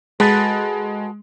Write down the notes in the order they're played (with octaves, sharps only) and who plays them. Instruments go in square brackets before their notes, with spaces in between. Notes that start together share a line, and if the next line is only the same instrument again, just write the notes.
[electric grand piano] G#3 [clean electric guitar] F#4 A4 B4